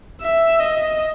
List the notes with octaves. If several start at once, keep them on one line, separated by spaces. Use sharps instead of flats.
E5
D#5